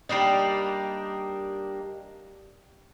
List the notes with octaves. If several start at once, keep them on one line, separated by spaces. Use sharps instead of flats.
G3 A#3 D4 D#4